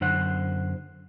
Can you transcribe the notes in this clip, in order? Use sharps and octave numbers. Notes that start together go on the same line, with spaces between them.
F#2 D3 C5 F#5